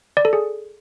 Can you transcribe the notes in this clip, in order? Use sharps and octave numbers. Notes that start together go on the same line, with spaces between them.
D5
A4
G#4